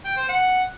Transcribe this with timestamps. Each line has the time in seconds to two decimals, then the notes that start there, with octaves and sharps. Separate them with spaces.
0.05 G5
0.17 C5
0.29 F#5